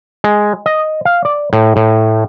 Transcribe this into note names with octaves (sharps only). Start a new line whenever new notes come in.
G#3
D#5
F5
D5
A2
A2